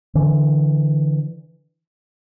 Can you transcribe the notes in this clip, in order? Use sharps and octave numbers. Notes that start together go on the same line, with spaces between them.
D3 E3